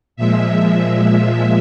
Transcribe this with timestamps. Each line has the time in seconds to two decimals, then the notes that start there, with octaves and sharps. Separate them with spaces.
0.16 A#2 F3 G#3 E5
0.83 E5